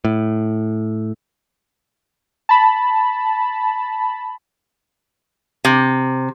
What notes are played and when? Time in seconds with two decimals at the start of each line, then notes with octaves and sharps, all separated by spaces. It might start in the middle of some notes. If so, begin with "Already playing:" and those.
0.05 A2
2.49 A5 B5
5.65 C3